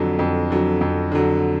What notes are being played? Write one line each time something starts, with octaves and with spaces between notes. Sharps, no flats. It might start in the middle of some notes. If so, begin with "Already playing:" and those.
Already playing: F2 D3 F#3
F2
D3 F#3
F2
D3 F#3